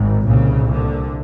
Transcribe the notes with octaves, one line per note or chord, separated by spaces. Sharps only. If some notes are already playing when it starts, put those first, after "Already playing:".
Already playing: G#1 G#2
C2 A#2 C#3
D3